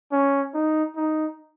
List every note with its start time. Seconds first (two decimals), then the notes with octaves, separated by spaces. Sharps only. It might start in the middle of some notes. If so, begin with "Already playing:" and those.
0.12 C#4
0.54 D#4
0.96 D#4